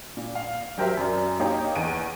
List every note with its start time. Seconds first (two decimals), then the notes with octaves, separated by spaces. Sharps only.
0.17 A#2
0.35 F5
0.78 F#3 G4 A#4 C5 E5
0.97 F#2 D5
1.39 A#3 D#4 G4 C#5 G5 A#5
1.75 E2 D7 D#7